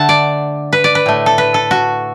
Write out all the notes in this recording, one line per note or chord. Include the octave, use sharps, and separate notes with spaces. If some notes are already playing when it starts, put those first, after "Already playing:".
Already playing: D3 A3 F#5 A5
D5
B4
D5
B4
A2 A3
A4
B4
A4
F#4